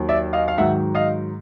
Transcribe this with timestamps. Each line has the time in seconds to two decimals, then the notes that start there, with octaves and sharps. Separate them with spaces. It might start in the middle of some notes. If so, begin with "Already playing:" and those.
Already playing: D#2 D#3 F#3
0.09 D5 E5
0.33 D#5 F5
0.48 F5
0.58 G#2 D#3 F#3 E5 F#5
0.95 D#5 F5